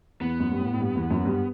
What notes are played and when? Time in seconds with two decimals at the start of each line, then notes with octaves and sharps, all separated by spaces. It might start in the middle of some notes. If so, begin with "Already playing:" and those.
0.20 E2 B3
0.40 F#2
0.52 G2
0.60 A2
0.73 A2
0.80 G2
0.96 E2
1.11 F#2
1.25 G2